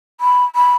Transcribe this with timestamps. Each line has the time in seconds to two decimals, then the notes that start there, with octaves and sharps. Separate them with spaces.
0.21 B5
0.56 B5